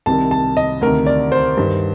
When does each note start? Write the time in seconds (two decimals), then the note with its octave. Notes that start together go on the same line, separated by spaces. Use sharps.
0.06 C2 C3 D#3 A5
0.31 A5
0.57 D#5
0.81 D2 C3 D#3 A#4
1.07 D5
1.32 C5
1.57 G2 D#3